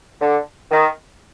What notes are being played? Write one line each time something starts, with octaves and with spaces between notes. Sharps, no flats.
D3
D#3